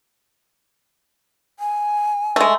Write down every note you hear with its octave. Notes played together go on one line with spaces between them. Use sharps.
G#5
G#3 A3